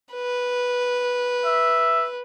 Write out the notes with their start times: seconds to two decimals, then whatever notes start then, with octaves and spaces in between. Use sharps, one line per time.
0.14 B4
1.46 E5